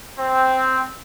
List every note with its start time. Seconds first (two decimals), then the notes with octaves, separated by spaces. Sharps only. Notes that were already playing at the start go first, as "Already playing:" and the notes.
0.18 C4